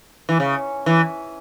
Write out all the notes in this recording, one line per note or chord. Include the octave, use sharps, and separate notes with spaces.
E3
C#3
E3